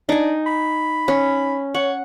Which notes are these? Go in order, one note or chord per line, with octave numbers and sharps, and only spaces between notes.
D4 D#4 G#5
B5
C#4
C#5 F#5